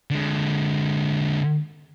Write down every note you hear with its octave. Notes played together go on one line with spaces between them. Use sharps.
D3 G#3